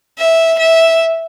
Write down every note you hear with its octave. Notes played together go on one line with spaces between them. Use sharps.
E5
E5